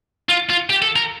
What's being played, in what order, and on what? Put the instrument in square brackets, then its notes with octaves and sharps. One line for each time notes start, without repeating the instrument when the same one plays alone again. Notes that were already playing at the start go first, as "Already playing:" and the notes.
[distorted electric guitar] F4
F4
G4
A4
A#4